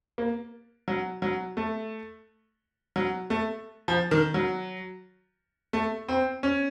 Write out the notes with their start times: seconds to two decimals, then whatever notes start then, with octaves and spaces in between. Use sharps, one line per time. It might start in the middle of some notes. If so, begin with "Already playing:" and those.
0.18 A#3
0.88 F#3
1.22 F#3
1.57 A3
2.96 F#3
3.30 A3
3.88 F3
4.11 D#3
4.34 F#3
5.73 A3
6.09 C4
6.43 C#4